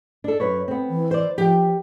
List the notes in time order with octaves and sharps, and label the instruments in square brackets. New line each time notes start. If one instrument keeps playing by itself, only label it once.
[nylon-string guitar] D4 A4
F#2 B4 C#5
B3 C4
[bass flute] E3
[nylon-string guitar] C5 D5
[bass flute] F3 [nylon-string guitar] G4 G5